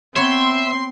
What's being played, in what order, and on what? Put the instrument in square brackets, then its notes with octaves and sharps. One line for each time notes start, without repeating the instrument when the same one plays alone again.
[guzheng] B3 C#5 [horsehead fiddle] C4 [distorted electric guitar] E5 [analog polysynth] C6